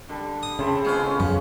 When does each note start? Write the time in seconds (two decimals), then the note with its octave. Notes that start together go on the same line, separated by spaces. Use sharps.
0.09 D3 G3
0.43 D#6
0.59 C#3 C4 E4 A4
0.85 G#3 B3 C#4 F4 C5
1.20 F#2 C#3